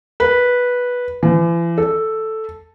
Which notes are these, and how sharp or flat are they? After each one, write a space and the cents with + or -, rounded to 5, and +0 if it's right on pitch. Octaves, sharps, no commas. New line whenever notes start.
B4 -10
E3 +40
A4 +0